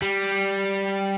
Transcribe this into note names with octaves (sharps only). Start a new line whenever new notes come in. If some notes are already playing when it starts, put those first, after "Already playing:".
G3